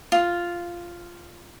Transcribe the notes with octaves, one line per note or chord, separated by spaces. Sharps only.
F4